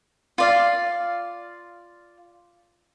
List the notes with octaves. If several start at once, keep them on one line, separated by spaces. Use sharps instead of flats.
F4 D5 F5